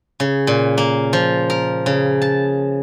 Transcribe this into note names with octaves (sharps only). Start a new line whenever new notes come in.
C#3
A#2
A#3
F3
A#4
C#3
A5